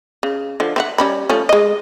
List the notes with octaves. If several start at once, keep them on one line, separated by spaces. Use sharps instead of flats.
C#3
D3 F3
C4 E5 F#5
G3 C#4 B5
F3 A3 C#4
G#3 D#5